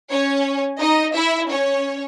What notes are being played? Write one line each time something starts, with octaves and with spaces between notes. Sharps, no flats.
C#4 C#5
D#4 D#5
E4 E5
C#4 C#5